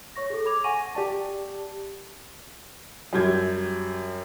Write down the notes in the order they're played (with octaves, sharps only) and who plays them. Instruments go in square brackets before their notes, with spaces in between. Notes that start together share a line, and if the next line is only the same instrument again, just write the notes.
[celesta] C#5 C#6 A#6
G#4 A4
B5 D6 G#6 F7
F#5 G#5 C#6 A#6 D#7
[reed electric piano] G4 D5 A5
[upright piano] F#2 G3 G6 G#6